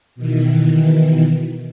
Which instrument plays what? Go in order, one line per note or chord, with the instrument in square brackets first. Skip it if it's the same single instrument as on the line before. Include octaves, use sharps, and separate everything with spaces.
[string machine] B2 D#3 E3